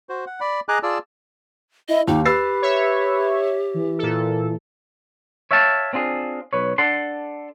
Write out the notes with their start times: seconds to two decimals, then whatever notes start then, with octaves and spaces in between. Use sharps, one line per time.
0.09 F#4 C5
0.27 F#5
0.40 D5 B5
0.69 G#4 D#5 G#5 A#5 D6 F#6
0.83 F4 G#4 D5 A5 E6
1.89 E4 D#5
2.08 D#2 D#4 G4
2.25 G4 B4 E6 A6 C7
2.62 C#5 E5
3.74 E3
3.98 A#2 A4
5.51 C#5 E5 F5 G5 A5
5.93 C4 D4 F4 G#4
6.53 B1 B4 C#5
6.78 D4 A4 F#5 A5 C6